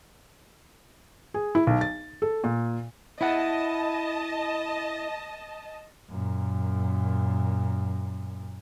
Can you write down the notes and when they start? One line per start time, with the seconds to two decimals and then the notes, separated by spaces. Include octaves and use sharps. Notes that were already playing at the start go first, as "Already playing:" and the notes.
1.34 G#4
1.55 E4
1.67 B1
1.81 A6
2.22 A4
2.44 A#2
3.21 E4 D#5 F#5 A5
6.10 F#2 A#2